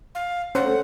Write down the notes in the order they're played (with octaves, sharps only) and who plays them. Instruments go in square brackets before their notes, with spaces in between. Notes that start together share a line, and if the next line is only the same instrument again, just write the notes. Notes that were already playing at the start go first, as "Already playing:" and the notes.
[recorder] F5
[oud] D2 A3 [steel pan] C#4 C5 [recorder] F#5